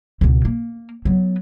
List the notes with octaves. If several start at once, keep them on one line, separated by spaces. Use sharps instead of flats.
C#2 B2
A#3
F#3 B3